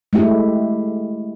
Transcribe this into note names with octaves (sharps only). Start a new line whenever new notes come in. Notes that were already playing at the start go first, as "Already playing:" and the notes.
G#3 A3 E4 G4